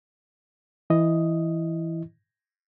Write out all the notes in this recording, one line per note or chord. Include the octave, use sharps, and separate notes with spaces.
E3 E4 D#5